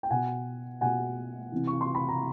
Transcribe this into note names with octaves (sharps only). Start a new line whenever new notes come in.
G5
B2 F#5 G#5
B2 F#5 G#5
C3 E3
C#6
C6
B5
A#5